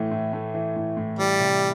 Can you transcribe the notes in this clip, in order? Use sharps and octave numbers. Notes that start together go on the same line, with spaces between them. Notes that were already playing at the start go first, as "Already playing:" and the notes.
Already playing: A2 E3 A3
A2
A3
E3
A2
A2
E3 G3
C3